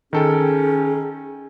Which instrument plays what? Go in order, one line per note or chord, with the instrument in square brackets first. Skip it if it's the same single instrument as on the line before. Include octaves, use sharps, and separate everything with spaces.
[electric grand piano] D#3 A4 G5 [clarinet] C#4 [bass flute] G#4